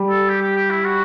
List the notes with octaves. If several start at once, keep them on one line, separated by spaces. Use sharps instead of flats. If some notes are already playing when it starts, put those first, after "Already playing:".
Already playing: G3
A4
G4
G4
G4
E4
F#4